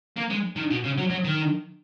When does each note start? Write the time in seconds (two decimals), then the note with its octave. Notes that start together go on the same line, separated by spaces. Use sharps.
0.17 A#3
0.30 G#3
0.56 D#3
0.71 B2
0.84 C#3
0.98 F#3
1.10 F#3
1.24 D#3